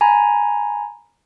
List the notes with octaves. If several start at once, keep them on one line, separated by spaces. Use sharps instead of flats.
G#5 A#5 B5